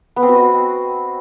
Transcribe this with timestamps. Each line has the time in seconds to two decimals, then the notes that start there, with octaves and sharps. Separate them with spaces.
0.16 B3
0.23 C4
0.29 F#4
0.35 D#5